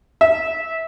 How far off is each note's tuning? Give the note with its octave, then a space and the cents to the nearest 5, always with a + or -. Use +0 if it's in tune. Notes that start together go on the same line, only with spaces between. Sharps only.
E5 -20